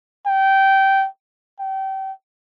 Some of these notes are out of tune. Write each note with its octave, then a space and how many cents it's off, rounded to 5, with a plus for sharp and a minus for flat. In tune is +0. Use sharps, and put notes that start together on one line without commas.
G5 -15
G5 -30